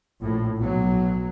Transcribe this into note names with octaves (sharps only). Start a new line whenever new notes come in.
A#1 A2
B1 F#3